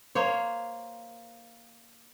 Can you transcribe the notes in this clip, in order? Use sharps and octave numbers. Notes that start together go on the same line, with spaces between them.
A#3 C5 C#5